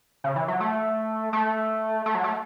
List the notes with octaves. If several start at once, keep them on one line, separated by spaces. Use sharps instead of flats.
C#3
E3
F#3
A3
A3
A3
F#3
A3